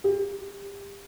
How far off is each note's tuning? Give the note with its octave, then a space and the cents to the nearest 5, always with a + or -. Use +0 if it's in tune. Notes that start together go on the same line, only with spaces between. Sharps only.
G4 +30